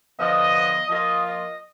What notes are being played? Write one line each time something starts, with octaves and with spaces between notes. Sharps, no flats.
D3 F3 B3 D#5
F3 A#3 F4 D#5
D#5